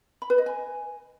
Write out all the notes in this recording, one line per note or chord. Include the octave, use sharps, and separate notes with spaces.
B5
B4
D#5
G#5